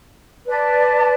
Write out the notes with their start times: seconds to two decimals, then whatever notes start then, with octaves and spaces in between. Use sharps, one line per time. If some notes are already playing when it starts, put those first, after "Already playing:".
0.46 B4 D5 A5